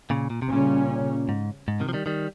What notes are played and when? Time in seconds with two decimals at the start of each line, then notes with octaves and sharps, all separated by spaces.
0.10 A#2 C#3
0.30 A#2
0.42 C3
0.49 A#2 C#3 G3 C#4
1.29 G#2
1.68 G#2
1.80 C3 D#3
1.89 F3
1.93 D#3 G3
2.06 D#3 G3